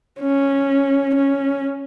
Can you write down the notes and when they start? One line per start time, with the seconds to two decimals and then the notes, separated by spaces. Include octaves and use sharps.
0.20 C#4
1.15 C#4